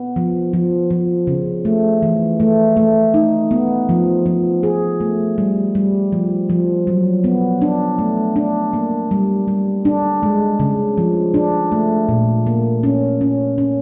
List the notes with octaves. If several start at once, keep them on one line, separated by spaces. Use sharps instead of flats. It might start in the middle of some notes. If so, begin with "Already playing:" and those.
Already playing: B3
F3
F3
F3
C#3
A3
E3
A3
A3
D#4
B3
F3
F3
G#4
A3
G3
G3
F3
F3
F#3
B3
D4
A3
D4
A#3
G3
G3
D4
G#3
C#3
F3
D4
A3
A#2
A#3
C#4
C#4
C#4